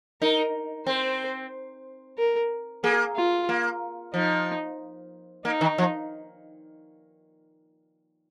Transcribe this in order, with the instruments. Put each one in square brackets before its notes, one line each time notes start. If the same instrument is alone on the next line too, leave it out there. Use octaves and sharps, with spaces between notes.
[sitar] D#4 [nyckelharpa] A#4
[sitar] C4 [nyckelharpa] C5
[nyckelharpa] A#4
[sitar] A#3 [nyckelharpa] G#4
[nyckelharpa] F4
[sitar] A#3
[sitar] F3 [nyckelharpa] D#4
[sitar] A#3 [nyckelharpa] D#4
[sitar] D#3
F3